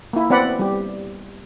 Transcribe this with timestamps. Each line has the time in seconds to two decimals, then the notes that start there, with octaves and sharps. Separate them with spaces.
0.13 A#3 E4
0.30 B3 C4 D5 F#5 B5
0.59 G3 G4